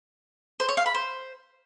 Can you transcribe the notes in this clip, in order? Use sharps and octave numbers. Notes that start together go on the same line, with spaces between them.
C5
C#5
F5
B5
C5